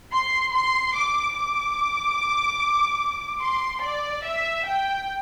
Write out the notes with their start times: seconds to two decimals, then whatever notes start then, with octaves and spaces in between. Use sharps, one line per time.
0.12 C6
0.53 C6
0.94 D6
1.36 D6
3.41 C6
3.83 D5
4.24 E5
4.65 G5